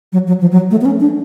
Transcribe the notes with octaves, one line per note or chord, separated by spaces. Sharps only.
F#3
F#3
F3
F#3
A3
B3
C#4
D4